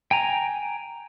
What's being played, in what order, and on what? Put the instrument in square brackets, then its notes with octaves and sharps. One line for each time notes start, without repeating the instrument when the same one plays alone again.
[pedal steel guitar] G5 G#5 A#5